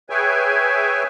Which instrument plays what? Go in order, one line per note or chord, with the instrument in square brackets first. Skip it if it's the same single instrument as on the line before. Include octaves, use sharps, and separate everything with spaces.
[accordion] G#4 B4 C#5 E5 G5 G#5